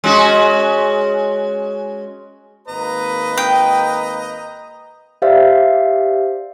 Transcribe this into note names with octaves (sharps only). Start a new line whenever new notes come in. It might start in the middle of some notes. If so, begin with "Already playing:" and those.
G#3 C#4 F#4
G#1 A#3 B4 D#5 A#5
G5
G4 C5 D5 E5 F5